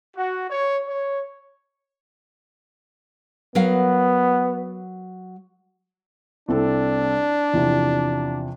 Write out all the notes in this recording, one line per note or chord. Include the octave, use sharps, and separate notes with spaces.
F#4
C#5
C#5
F#3 B3 A#4 F5
C2 C4 D4 A4
E2 C3 F3